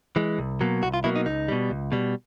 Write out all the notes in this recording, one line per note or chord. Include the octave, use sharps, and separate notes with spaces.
E3 G#3
C2
B2 F#3 A#3
C2 F#4
F4
B2 F#3 A#3 E4
D#4
C#2 D#4
B2 G3
C#2
B2 G3